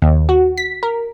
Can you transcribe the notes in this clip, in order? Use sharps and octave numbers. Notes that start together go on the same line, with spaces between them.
D#2
F#4
B6
A#4